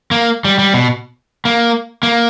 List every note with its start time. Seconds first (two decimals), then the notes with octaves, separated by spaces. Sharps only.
0.11 A#3
0.45 G3
0.59 G3
0.74 B2
1.45 A#3
2.03 A#3